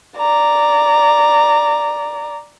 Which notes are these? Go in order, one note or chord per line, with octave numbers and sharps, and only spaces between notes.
D5 A#5